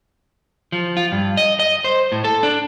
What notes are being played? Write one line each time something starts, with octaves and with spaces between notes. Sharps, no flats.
F3
F4
G2
D#5
D#5
C5
A2
A4
D4